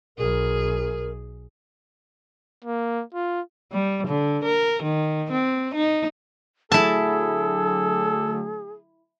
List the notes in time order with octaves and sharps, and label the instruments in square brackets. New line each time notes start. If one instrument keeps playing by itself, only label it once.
[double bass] B1 [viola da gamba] G#4 [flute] A#4
[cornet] A#3
F4
[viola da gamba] G3
D3
A#4
D#3
C4
D#4
[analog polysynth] D3 F#3 A3 [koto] E4 A5 [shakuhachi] G#4 [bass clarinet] A4